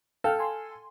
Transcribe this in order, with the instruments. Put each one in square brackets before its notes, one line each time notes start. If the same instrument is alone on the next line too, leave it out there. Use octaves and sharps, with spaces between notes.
[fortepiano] A4 [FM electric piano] F5 G5 F6
[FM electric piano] G#5 C6